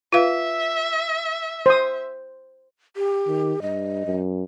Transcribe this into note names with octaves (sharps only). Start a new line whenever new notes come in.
F4 B4 E5 F5
C5 D#6
G4
D#3
G2 D#5
F#2